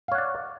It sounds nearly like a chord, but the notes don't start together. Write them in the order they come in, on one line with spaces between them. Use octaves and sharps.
F5 C#5 F#5 D5